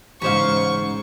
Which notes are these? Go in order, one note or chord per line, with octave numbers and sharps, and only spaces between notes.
A1 G#2 C#3 C#4 C5 F5 C#6